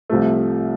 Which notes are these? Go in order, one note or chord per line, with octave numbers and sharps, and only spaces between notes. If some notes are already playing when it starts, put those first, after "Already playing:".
C2 C3 F3 A3